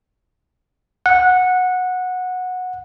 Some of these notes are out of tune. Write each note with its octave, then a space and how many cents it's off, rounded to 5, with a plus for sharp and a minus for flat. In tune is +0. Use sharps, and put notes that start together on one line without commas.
F#5 -15